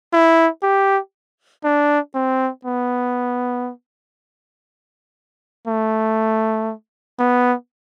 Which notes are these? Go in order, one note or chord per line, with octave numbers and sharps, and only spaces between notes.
E4
G4
D4
C4
B3
A3
B3